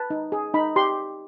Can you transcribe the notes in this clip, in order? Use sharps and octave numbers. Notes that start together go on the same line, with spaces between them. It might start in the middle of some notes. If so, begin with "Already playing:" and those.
Already playing: B4 A5
D#4
G#4
D#4 B5
G4 C6